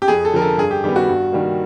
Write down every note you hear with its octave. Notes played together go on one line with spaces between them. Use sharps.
G4
F2 G#4
A4
D3 F3 A#4
A4
G2 G#4
G4
D#3 G3 B3 G4
F#4
G2
D#3 G3 A#3